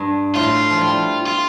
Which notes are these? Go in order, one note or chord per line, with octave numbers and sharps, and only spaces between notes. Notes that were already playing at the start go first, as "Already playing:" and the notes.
Already playing: G2
A2 F4
F3
G3
F4